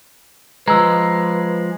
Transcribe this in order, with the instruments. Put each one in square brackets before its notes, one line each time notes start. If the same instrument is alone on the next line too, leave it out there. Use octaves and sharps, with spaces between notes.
[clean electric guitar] F3 G#3 [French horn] B4 [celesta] A#5 E6